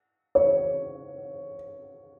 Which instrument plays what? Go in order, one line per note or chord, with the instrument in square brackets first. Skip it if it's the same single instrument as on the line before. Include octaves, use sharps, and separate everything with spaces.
[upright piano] C#5